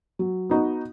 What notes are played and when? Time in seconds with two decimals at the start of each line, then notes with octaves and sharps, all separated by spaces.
0.19 F#3
0.50 B3 D#4 F#4